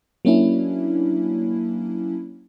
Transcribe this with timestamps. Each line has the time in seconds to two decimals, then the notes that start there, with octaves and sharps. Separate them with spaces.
0.25 F#3 A#3 C#4 D4 E4